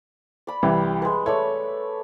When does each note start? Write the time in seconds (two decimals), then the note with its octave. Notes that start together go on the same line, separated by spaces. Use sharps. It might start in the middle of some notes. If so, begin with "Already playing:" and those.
0.47 D5 B5
0.63 C2 E3 G3
1.02 G#3 B4
1.26 A3 B4 C#5 D5